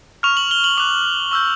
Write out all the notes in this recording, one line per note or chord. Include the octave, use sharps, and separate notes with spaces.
C#6 F6 F7
F#7
G7
F#7
D6 F#6 F7
C#6 E6 G6